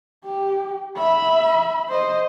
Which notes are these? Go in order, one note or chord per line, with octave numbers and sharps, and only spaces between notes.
G4
E5 B5
C5 D#5